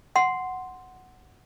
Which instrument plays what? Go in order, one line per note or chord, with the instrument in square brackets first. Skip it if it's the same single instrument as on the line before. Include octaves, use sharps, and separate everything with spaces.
[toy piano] F#5 C6